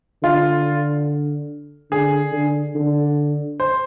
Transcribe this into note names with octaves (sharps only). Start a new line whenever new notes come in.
D3 F4
D3 G#4
D3
D3
C5